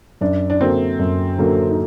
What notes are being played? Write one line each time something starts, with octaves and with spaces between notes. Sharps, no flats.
F#2 D4
D4
D3 F#3 A#3 C4
F#2
D3 F#3 A#3
D#4